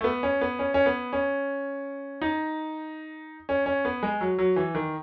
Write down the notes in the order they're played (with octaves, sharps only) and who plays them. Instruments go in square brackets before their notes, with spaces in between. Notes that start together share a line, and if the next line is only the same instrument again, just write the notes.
[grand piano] A3
B3
C#4
B3
C#4
C#4
B3
C#4
D#4
C#4
C#4
B3
G#3
F#3
F#3
E3
D#3